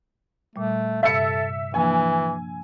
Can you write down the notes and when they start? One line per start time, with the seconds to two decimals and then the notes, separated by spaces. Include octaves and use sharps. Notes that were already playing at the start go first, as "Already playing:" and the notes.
0.56 A#2 G3 A3
1.03 G2 C3 A4 E5 E6 G6 C#7
1.74 E3 F3 A#3 D4 G#5